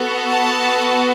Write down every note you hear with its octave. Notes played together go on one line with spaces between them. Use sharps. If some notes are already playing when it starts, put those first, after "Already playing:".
Already playing: B3 F#4 A4
A5